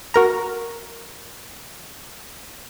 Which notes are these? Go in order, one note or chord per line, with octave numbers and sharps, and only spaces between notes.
F#4 A#4 A#5